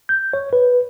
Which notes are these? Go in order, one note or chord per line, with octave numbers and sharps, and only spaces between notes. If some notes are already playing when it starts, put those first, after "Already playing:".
G6
C#5
B4